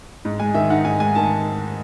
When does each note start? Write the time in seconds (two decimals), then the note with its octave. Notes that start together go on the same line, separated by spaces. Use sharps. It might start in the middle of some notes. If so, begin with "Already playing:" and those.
0.25 G#2
0.40 G#3 G#5
0.54 D#3 E5
0.70 D#4 F#5
0.85 G#2 G#5
1.00 G#3 G#5
1.15 D#3 A5